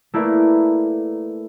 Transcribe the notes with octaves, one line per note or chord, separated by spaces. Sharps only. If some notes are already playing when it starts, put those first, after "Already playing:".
A3 A#3 E4 A#4 B4 D5